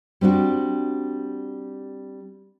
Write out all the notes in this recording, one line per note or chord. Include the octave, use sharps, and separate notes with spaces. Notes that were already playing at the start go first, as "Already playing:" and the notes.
G3 C4 D4 F#4